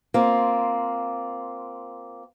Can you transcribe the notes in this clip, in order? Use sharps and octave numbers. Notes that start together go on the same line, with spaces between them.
A#3 C4 F4